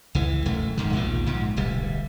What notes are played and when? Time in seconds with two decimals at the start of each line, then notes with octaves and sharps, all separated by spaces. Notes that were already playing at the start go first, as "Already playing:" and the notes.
0.15 C#2 E3
0.46 E1 F#2 A3
0.77 D#1 G#2 D#3
0.93 A#1 D#2 B2 F3
1.26 A#1 G#2
1.57 D1 B1 G3